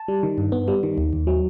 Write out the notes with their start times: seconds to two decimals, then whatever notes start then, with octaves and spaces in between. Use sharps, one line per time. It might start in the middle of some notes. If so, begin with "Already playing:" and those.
Already playing: A5
0.08 G3
0.23 D#3
0.38 G2
0.52 B3
0.68 G3
0.83 D#3
0.98 D#2
1.13 D#2
1.27 F#3